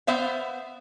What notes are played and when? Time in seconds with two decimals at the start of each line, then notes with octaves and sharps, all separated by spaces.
0.07 B3 C5 E5 F5